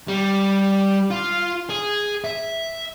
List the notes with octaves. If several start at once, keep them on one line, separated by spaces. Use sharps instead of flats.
G3
F4
G#4
E5